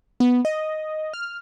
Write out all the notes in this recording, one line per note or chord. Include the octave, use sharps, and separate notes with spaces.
B3
D#5
F6